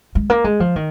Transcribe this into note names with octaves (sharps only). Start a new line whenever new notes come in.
G#3
A#3
G#3
F3
D#3